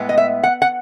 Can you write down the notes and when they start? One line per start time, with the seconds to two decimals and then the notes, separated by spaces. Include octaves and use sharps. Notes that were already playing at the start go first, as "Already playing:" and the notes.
Already playing: A2 G#3 B3
0.09 D#5
0.18 E5
0.43 F#5
0.62 F#5